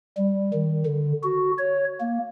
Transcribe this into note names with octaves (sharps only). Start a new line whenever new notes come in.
G3
D#3
D3
F#4
C#5
A#3